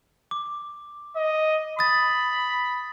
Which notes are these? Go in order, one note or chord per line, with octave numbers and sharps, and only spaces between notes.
D6
D#5
B5 D#6 A6